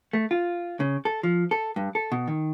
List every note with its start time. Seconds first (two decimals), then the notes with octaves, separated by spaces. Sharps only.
0.13 A3
0.31 F4
0.80 C#3
1.05 A4
1.23 F3
1.51 A4
1.76 G2
1.95 A4
2.12 B2
2.28 D#3